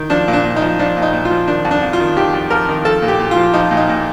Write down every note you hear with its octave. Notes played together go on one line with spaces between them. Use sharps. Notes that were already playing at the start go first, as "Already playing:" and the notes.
Already playing: D#3
F3 D4
A#2
D4
A#2
D#4
F3
F3 D4
A#2
D#4
A#2
F4
F3
D#3 D4
F2
D4
F2
F4
D#3
D#3 G4
F2
F2 A#4
D#3
F3 A4
A#2
G4
A#2
F4
F3
F3 D#4
A#2
D#4
A#2